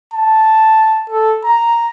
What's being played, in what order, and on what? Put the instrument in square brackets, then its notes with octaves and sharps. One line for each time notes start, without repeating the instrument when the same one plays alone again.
[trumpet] A5
A4
A#5